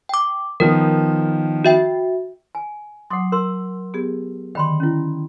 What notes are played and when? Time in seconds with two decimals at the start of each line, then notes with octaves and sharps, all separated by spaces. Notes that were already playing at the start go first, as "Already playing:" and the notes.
0.09 G5 D6
0.60 D#3 F3 B3 A#4
1.65 F#4 E5 G5
2.55 G#5
3.10 F#3 F#5 C6 D6 D#6
3.32 A#4 C6 E6
3.94 B3 G4 G#4
4.55 D3 D#3 G5 B5 C6
4.80 C#4 E4